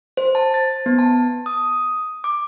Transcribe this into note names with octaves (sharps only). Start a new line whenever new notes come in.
C5
A5
A6
B3
A5
D#6
D6